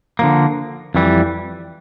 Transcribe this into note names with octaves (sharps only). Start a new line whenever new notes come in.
D3 F3 A#3
F2 E3 G3